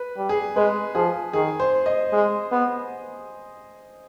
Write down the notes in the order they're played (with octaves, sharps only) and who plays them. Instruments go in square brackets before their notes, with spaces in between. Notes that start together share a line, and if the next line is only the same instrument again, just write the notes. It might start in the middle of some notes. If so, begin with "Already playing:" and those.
Already playing: [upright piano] B4
[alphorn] G3
[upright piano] G#4
[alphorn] G#3 [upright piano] B4
[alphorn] F3 [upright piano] G#4
[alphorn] D#3 [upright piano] G#4
[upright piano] C5
D#5
[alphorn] G#3
B3